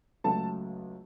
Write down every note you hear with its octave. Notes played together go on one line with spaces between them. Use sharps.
C#2 C#3 F#3 A3 A4 A5